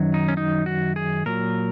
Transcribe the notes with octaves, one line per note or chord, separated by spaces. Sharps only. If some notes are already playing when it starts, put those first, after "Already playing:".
Already playing: F#2 D#3 F#3
D#4
C#4
D#4
F#4
G#4
A#2 F#3 A#4